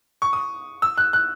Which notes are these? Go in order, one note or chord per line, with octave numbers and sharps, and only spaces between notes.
C#6
D#6
E6
F#6
F#6